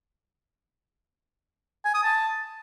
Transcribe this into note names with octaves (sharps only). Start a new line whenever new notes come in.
G#5
D#6
A5